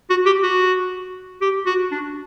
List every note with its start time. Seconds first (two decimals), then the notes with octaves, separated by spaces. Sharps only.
0.10 F#4
0.26 G4
0.43 F#4
1.41 G4
1.66 F#4
1.91 D4